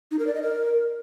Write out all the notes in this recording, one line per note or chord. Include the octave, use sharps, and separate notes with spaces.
D#4
A#4
D5
D#5
A#4